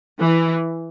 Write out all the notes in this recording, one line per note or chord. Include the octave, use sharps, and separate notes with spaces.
E3